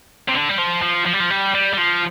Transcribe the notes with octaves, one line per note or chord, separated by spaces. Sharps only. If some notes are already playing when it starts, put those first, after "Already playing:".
C3
D3
G3
F3
F3
F3
G3
F3
G3
G3
G3
F3